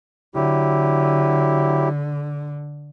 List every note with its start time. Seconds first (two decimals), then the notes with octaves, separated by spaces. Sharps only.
0.35 D3 F#3 E4 G4